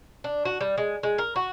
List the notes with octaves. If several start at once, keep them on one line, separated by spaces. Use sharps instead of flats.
D4
F#4
G3
G#3
G#3
A#4
F#4